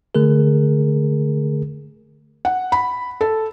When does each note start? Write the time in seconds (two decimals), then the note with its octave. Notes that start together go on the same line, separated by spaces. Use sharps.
0.15 D3 A3 G#4 A#4
2.45 F#5
2.72 B5
3.21 A4